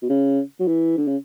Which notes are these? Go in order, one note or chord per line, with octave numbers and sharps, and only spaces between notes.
B2
C#3
F#3
E3
D3
C#3